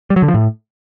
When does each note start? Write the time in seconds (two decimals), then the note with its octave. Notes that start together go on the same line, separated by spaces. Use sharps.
0.10 G3
0.16 F#3
0.22 D3
0.28 F3
0.34 A2